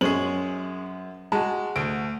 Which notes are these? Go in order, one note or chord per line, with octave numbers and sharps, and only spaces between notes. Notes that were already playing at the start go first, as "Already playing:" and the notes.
F#2 G#3 C#4 G#4 C5 F#7
G#3 F#4 A5
D2 D7